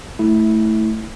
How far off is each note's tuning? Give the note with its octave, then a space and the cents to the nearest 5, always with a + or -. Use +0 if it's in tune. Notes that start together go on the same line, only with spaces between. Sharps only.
A3 +0 E4 -15